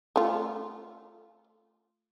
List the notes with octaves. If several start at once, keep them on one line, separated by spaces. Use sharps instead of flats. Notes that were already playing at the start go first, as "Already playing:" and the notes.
A3 F4